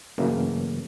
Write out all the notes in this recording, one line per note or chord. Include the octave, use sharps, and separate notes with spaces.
G2 C#3 E3 F#3 A3 A#3